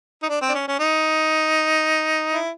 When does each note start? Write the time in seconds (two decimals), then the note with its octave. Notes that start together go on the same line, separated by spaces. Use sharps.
0.23 D#4
0.29 D4
0.41 C4
0.49 D4
0.55 C#4
0.68 C#4
0.79 D#4
2.32 E4